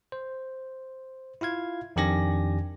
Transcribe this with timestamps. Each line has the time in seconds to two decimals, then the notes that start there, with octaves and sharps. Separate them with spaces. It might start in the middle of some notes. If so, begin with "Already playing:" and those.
0.12 C5
1.41 E4 F4 F5 G#6
1.96 F2 D#3 D4 G4 G#5 A#6